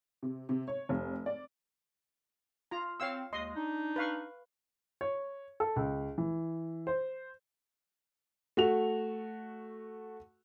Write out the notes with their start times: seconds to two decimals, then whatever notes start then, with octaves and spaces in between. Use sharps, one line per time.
0.23 C3
0.49 C3
0.68 C#5
0.89 F1
1.26 D5
2.71 F4 A#5
3.00 C4 C#5 F5 E6
3.33 D#2 G#3 D#5 C6
3.54 D4 D#4
3.96 B4 F5 C#6
5.01 C#5
5.60 A4
5.76 C#2
6.18 E3
6.87 C5
8.57 A3 F#4 F7